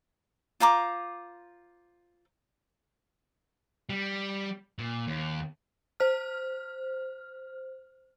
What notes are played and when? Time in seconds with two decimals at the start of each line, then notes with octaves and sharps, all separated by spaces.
0.60 F4 C5 A#5 D6
3.89 G3
4.79 A#2
5.07 D#2
6.00 C5 F6